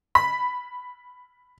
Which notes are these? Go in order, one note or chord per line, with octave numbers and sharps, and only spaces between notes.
B5 B6